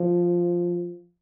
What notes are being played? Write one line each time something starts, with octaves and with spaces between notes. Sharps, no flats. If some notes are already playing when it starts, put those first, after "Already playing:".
Already playing: F3